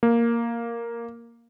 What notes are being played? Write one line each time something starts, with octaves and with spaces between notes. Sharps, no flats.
A#3